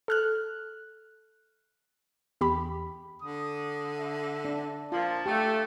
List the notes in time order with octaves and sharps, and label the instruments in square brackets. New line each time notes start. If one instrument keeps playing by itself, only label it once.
[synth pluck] A4 F6 F#6
E2 G4 B5
[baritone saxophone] D3 [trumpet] D#6
[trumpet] E5
[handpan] D4
[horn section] A#2 F3 [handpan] F4 [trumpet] A5
[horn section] A3 [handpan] G4